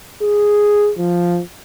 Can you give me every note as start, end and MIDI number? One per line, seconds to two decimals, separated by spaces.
0.22 0.91 68
0.98 1.40 53